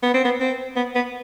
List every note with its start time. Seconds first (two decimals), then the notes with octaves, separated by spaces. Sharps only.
0.03 B3
0.14 C4
0.25 B3
0.40 C4
0.76 B3
0.95 B3